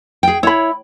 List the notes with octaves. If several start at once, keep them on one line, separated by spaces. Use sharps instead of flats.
G#4 G5
E4 C#5 B5